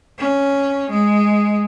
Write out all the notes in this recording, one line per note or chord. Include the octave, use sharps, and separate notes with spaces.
C#4
G#3